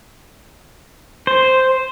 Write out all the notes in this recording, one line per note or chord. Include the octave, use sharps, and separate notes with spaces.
C5